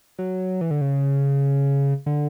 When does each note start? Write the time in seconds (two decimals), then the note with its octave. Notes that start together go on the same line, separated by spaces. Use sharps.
0.19 F#3
0.61 E3
0.71 D3
0.81 C#3
2.06 D3